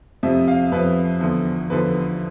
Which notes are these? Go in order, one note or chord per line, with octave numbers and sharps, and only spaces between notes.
F2 C3 F3 E5
F5
F2 C3 F3 B4
E2 D3 F3
E2 D3 F3 B4